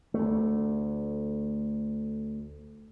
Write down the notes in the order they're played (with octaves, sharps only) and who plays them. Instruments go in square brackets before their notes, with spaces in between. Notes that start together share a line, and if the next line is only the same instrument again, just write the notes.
[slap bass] D2 A3